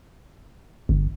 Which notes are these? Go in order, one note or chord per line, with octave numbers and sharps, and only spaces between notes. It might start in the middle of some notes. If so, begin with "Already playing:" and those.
G1